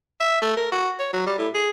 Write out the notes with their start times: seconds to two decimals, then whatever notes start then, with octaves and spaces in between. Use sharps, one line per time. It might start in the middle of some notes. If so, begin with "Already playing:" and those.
0.20 E5
0.42 A3
0.57 A#4
0.72 F#4
0.99 C#5
1.13 F#3
1.26 G3
1.38 A2
1.55 G#4